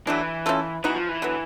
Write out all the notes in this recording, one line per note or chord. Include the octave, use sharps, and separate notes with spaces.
E3 F#3 A3 D4
A3 C#4 F4 A4
E3 B3 D#4 F#4
F3
E3
D3 F#3 B3